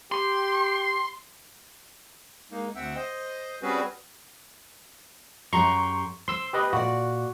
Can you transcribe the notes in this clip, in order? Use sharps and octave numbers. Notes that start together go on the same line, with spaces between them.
G4 C6
G#3 A#3 D#4
D2 C4 E5 F#5 G5 E6
C5 D#5
G3 C4 C#4 F#4 G#4 B4
F#2 G4 A#5 C6 C#6
C5 C6 E6
G4 B4 D#5
A#2 F#4 D5